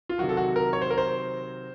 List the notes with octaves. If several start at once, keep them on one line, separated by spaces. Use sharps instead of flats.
F4
C3 D#3 F#3 F#4
A4
F#4
A#4
C#5
C5
A#4
C5